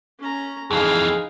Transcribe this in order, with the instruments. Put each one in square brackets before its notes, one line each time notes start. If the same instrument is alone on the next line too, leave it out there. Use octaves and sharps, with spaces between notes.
[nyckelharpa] C#4 A#5
[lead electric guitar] F2 E3 [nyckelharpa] D#4 F5 [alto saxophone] G#4